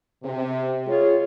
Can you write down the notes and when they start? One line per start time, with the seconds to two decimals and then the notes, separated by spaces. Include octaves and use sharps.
0.23 C3
0.87 G#3 F4 G#4 C#5